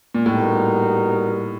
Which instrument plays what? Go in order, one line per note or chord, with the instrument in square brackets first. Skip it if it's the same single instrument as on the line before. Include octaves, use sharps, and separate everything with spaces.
[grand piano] A#2
[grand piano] A2 [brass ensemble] G3 B3 D#4 F#4 A#4